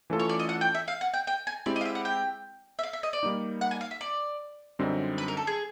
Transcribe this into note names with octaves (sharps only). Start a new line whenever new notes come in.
E3 A3 C#4 F4 A4
C#5
D5
D#5
F#5
G5
E5
F5
F#5
G5
G5
G#5
G#3 C4 E4 G4 D5
D#5
F5
E5
F#5
G5
E5
F5
E5
D#5
D5
G3 A#3 D#4
F#5
G#5
F5
E5
D5
F#2 D3 G3 C4 D#4
B4
A#4
A4
G#4